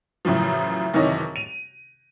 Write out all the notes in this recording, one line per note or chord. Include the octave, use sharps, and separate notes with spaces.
F#2 A2 C#3 E3 F3
F#1 C3 D#3 E3 C#5 D#5
D#7 F7